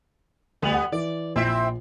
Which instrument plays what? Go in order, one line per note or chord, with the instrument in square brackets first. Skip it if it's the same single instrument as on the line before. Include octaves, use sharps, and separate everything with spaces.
[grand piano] D2 F7 F#7 [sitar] G3 B3
[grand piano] F#5
[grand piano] E3 [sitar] D5
[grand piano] A#1 [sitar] C4 E4 E5